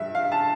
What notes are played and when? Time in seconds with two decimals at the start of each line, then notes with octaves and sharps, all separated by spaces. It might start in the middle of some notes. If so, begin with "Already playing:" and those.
Already playing: G2 F3 E5
0.15 F5
0.32 A5